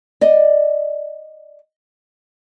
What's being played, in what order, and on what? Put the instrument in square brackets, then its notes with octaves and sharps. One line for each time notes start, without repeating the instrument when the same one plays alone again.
[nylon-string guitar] D5 D#5